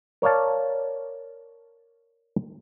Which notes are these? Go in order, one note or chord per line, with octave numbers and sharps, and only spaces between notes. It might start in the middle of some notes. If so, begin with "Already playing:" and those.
A#4 C#5 D5 F5 A5